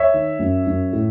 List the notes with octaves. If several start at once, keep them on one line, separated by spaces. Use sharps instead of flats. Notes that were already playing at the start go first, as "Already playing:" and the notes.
Already playing: C#5 E5
D#3
F#2
F#2
A2